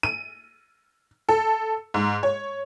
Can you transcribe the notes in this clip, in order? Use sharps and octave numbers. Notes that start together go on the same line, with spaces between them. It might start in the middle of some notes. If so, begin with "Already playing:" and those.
D#7
A4
G#2
C#5